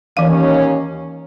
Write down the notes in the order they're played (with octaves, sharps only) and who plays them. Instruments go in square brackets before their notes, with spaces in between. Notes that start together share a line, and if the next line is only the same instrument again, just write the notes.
[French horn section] D#2 C#4 [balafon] E3 F5